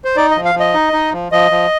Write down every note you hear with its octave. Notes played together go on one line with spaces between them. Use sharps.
C5
D#4 D5
D#5
F3
F5
F3
D#5
D#4
D#4
F3
F3 D#5
F3